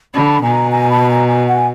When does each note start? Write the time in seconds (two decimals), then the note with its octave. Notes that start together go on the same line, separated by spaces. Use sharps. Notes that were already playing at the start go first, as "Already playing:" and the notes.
0.14 D3 A5 B5
0.43 B2 G#5 A#5
0.71 G#5 A#5
0.90 A5 B5
1.09 G#5 A#5
1.27 G#5 A#5
1.47 F#5 G#5